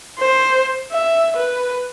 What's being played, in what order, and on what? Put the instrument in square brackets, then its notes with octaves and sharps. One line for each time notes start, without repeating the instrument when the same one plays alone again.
[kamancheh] C5
E5
B4